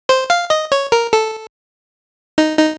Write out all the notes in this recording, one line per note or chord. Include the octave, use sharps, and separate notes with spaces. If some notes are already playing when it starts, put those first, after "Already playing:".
C5
F5
D#5
C#5
A#4
A4
D#4
D#4